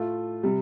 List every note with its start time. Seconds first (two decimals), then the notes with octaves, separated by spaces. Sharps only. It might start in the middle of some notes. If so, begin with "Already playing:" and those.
Already playing: A2 A3 F4
0.43 C3 G3